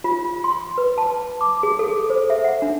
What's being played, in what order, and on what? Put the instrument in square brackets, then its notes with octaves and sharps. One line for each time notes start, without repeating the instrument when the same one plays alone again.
[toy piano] F4
C6
B4
A5
D6
G#4
A4
C5
E5
F#5
D4